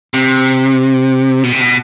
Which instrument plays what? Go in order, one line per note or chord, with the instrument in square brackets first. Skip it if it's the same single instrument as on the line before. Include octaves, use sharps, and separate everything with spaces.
[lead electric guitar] C3
B2
C3
B2